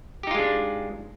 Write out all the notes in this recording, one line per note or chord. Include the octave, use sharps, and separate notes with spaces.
G#3 D4 D#4 F4 G4